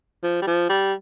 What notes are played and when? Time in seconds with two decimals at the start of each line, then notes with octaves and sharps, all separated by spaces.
0.23 F3
0.42 G3
0.47 F3
0.70 G3